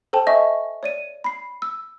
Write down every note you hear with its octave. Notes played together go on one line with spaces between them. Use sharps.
A4 C5 G5 A5
D#5 E5 G#5 C#6
C#5 D5 D#7
B5 C7
E6